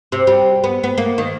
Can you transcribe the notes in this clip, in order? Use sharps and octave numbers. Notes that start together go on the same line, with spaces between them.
C3
G3
B3
B3
A#3
D#3